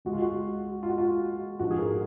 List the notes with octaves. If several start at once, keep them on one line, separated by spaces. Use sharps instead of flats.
C#2 C#3 G#3 F#4
F4
F#4
F4
F#4
F4
A#1 G#2 F3 F#4
G#4
A#4